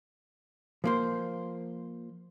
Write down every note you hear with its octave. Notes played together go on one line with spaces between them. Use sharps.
F3 A#3 C5